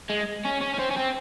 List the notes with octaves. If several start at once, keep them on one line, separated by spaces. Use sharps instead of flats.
G#3
C#4
C#4
C#4
C4
C#4
C4